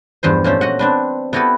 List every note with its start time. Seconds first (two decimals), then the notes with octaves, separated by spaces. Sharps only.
0.23 E2 G2 F3 C5
0.44 A#2 A3 C#4 C5
0.61 F#4 D#5 F#5
0.79 C4 D4 B4
1.33 B3 E4 F#4 G4 A4 B4